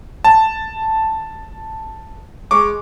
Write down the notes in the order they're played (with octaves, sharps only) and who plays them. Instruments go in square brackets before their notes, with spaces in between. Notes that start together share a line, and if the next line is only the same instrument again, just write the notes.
[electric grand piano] A5
G#3 C#6 D6